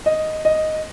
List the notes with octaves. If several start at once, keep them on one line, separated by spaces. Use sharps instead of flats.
D#5
D#5